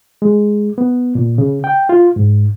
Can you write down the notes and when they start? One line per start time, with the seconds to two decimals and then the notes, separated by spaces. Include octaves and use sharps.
0.22 G#3
0.78 B3
1.15 A#2
1.38 C#3
1.64 G5
1.89 F4
2.16 G#2